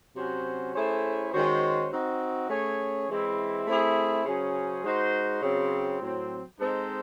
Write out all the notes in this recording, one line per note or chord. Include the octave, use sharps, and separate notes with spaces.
C3 F#3 C#4 F#4 C5
A3 C#4 E4 G#4 C5
D#3 G#3 C#4 F#4 C5
C4 D#4 F#4
A3 C#4 G#4 C#5
E3 G#3 C4 E4
A3 C4 E4 G#4
C#3 F#3 C#4 G#4 C5
G#3 D#4 F#4 C5
C#3 F#3 C4
A2 F#3 C4
G#3 C4 D#4 A4 C5